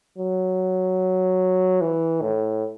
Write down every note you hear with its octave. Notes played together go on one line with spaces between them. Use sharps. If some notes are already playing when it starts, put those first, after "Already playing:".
F#3
E3
A2